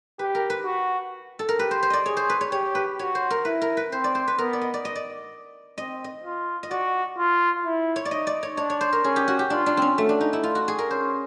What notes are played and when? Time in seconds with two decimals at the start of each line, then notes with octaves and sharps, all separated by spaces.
0.19 G4 B4
0.35 A#4
0.50 B4
0.65 F#4
1.39 A4
1.49 A#4
1.59 G4 B4
1.71 C5
1.83 C5
1.90 D5 D#5
2.06 G#4 C#5
2.17 C5
2.29 B4
2.41 C#5
2.52 G4 C#5
2.75 B4
2.99 F#4 C#5
3.15 C5
3.30 A#4
3.45 E4 B4
3.61 A#4
3.77 B4
3.92 C4 C5
4.04 D5
4.15 C5
4.27 B4
4.38 B3 A#4
4.53 D5
4.61 D#5
4.74 D5
4.85 D#5
4.95 D5
5.78 C4 D#5
6.04 D#5
6.24 F4
6.63 D#5
6.71 F#4 D5
7.18 F4
7.65 E4
7.96 C#5
8.05 D5
8.11 D#4 D#5
8.27 D5
8.43 C#5
8.57 D4 C#5
8.70 C#5
8.81 C5
8.93 A#4
9.04 C#4 G#4
9.16 G4
9.28 F#4
9.39 G4
9.50 D4 F4
9.66 D4
9.77 C4 C#4
9.97 A3 F#4
10.09 D4
10.21 D#4
10.33 E4
10.43 D4 F4
10.55 F#4
10.68 G#4
10.79 A#4
10.90 C#4 C5